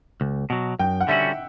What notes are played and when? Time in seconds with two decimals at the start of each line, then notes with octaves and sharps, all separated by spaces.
0.21 C#2
0.50 B2 F#3
0.79 F#2 G5
1.01 F#5
1.08 D3 G3 C#4 F#4 E5